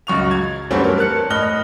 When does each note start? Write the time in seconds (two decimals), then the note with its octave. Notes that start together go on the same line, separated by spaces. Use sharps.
0.07 C#2 F#2 C#6 F7
0.31 G#6
0.71 G2 E3 F#3 A3 C4 C#4
0.84 A#4
0.98 A#4 A5 F#6 C#7
1.30 A2 D#5 F6 F#6 G7